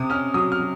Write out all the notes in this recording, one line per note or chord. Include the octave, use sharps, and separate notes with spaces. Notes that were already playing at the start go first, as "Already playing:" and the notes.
Already playing: C3 D#6
C#4 F6
F#3 D#6
F6
F#3